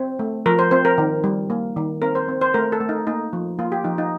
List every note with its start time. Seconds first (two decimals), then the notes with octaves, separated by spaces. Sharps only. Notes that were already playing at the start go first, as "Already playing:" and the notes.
Already playing: C4
0.19 A3
0.46 F3 A#4
0.59 C5
0.71 C4 C5
0.85 A#4
0.98 D#3
1.24 G3
1.50 A#3
1.77 D#3
2.02 C4 A#4
2.15 C5
2.28 C4
2.41 C5
2.54 A3 A#4
2.72 A4
2.80 A3
2.89 D#4
3.07 A#3 D#4
3.33 F3
3.59 A#3 F4
3.72 G4
3.84 F3 D#4
3.98 D#4